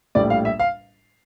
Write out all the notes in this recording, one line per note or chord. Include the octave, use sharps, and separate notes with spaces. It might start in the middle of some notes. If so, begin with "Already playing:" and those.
A#1 A2 G3 D5
F5
E5
F5